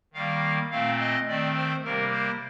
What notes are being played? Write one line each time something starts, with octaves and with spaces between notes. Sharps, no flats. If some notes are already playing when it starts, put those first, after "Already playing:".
D#3 G3 A#3 F5
A#2 A3 C4 F5
D#5
D#3 A3 C4 D5
C5
C3 G3 A#3 A#4
C5